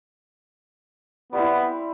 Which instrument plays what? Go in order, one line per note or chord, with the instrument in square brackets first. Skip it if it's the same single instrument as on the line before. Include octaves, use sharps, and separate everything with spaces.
[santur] G3 C4 E4 [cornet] B3